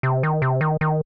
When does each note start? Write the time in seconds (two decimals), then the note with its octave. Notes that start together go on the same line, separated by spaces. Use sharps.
0.03 C3
0.23 D#3
0.42 C3
0.61 D#3
0.81 D#3